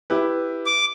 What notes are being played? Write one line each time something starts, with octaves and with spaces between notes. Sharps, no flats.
E4 G4 B4
D6